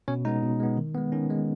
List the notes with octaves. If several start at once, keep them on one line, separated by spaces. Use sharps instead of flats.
B2 C#4 C#5
G#3 B3 D#4
B2
G#3 B3
D#3
G#3 B3
D#3 C#4
G#3 B3